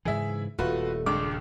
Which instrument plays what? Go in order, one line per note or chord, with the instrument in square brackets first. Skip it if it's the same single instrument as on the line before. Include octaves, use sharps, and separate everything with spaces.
[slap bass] G#2 C#3 E3 [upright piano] G#4 E5
[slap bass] D#1 [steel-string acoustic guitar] A3 [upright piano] F4 F#4 B4
[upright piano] C#2 G2 [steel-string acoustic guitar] G#3 [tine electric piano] D6